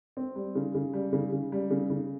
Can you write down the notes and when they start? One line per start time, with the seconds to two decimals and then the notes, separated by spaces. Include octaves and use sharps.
0.17 C4
0.36 G3
0.55 C#3
0.74 C#3
0.93 G3
1.13 C#3
1.32 C#3
1.52 G3
1.70 C#3
1.90 C#3